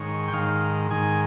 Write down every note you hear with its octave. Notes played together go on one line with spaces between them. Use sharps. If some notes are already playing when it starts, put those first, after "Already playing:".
Already playing: G#2 D#3 C#5
G5
G#2 D#3 F5
G#2 D#3 G#5